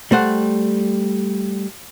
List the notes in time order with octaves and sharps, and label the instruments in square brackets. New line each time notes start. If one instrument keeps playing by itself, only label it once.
[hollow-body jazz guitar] G3 A3 C5 F#5